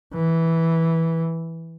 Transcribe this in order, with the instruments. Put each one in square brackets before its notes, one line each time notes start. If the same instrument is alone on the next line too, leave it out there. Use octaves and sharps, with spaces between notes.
[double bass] E3